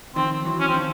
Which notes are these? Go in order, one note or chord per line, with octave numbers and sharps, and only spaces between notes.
D#3 F3 C4
E3 F#3
C#4
C4
D#3 F3